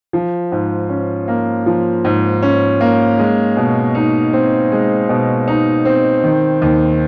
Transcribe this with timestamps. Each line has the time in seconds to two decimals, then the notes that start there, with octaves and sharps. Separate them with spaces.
0.13 F3
0.52 G#2
0.89 C#4
1.28 A#3
1.66 F3
2.04 G#2
2.42 C#4
2.81 A#3
3.19 G#3
3.57 B2
3.95 D#4
4.33 C4
4.72 G#3
5.09 B2
5.48 D#4
5.85 C4
6.24 D#3
6.62 D#2